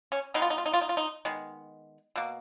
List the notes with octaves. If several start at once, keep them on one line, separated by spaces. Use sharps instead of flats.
C#4
B2 G#3 B3 D#4
F4
D#4
F4
D#4
F4
D#4
F4
D#4
D#3 G#3 B3
B2 A#3